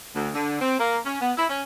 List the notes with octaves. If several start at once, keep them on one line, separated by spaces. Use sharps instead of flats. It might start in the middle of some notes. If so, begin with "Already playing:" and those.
D2
D3
C4
A#3
C#4
B3
E4
C#4